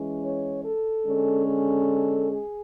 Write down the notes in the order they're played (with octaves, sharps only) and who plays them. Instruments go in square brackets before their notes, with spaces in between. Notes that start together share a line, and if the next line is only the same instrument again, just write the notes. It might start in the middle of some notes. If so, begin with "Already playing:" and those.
Already playing: [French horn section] E3 G#3 C#4
C#5
A4
D3 G#3 C#4
A4
G#4